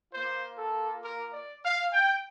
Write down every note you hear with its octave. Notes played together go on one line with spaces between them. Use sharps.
A#3 F4 C5
A4
A#4
D5
F5
G5